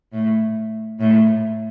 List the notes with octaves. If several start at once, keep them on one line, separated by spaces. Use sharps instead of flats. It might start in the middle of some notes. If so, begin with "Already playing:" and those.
A2
A2